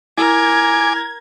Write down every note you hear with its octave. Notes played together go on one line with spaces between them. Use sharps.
E4 A#4 G#5 D6 G#6